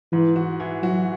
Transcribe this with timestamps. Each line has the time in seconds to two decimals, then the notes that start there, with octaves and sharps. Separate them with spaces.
0.12 G#2 E3
0.36 F#4
0.60 E3
0.83 F#3 F#4